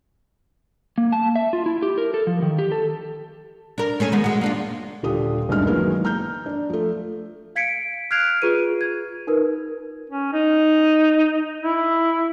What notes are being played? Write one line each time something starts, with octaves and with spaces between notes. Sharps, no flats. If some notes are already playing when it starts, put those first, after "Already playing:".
A#3
A5
E5
F4
E4
G4
A#4
A4
F3
D#3
G4
A4
D4 A#4
A3 C#4 G#4
D#3 G#3 B3
G#3 F#4
A#3 D4 F4
D#1 D3 F4 G4 D#6
F#1 D2 G2 G#3 D#4 F6
D#3 E3 F#3 G#3 A#3 B3
A#5 F6 G6
D4
F3 A3
F5 G#6 B6 C#7 D7
F6 F#6 G#6 C7 D7 F7
F4 G#4 B4 D#7
G#6
D#4 A#4 B4
C#4
D#4
E4